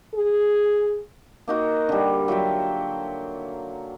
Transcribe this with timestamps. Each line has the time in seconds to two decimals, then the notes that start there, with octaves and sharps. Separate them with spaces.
0.14 G#4
1.48 A#3 D#4 F#4
1.89 D3 G3
2.28 F#3 F4 E5 G5